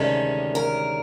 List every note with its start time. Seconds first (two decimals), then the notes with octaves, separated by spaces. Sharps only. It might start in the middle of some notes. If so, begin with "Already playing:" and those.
Already playing: D2 C3 D#3 G#3 C#4 A4
0.55 A#4